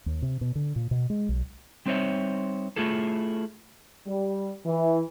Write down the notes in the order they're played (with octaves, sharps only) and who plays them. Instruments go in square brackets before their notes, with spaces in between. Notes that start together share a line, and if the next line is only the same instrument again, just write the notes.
[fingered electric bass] D#2
C3
B2
D3
A#2
B2
G#3
B1
[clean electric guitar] G3 C4 D#4 C5 C#5 E5
A3 E4 F4 G#4 A4
[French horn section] G3
E3